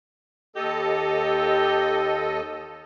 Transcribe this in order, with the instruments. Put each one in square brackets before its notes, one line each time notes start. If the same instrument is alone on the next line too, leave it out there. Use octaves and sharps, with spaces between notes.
[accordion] D#2 A4 D#5 [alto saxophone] G4